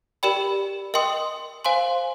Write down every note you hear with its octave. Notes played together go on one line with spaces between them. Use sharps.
G4 A#4 D5 G5 B5
A#4 D#5 G5 C6 D#6
C5 F5 G#5 C6